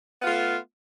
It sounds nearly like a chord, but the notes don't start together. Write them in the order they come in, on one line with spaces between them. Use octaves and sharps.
B3 F4 A3